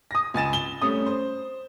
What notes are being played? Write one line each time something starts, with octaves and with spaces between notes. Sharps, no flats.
D#6 A#6
C#2 G#5 A6 E7
G7
G3 A3 C#4 D#6
C5